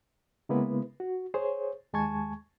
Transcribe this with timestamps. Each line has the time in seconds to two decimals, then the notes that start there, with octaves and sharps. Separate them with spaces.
0.49 C#3 G#3 A#3 B3 E4 B4
1.00 F#4
1.34 G#4 C5 C#5
1.93 D#2 G#3 G#5 A5 C#6 G#6